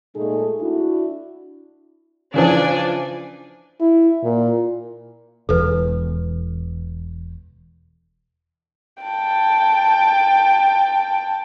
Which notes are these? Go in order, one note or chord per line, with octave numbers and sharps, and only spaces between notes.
A#2 G#3 A3 D#4 G#4 A4
D4 E4 F#4
C#3 E3 F3 D4 D5 G#5
E4
A#2
E1 E2 A4 B4
G5 A5